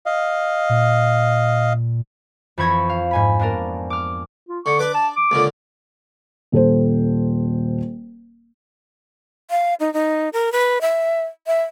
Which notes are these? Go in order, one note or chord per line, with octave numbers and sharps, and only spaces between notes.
D#5 F5
A#2
F2 E3 B5 C#6 G#6 A#6
F5
G#2 G#5 B5
A#3 B3 D4 A#4
D6 F6
F4
D3 C#6
D4 B4 D6
A5
D6
C#2 A#2 D3
D#1 A4 C5
F5
D#4
D#4
A#4
B4
E5
E5